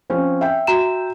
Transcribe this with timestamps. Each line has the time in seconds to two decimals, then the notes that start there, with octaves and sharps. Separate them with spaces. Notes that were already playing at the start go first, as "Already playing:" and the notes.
0.10 F3 C4 C#4
0.41 E5 G5
0.67 F#4 A#5 E7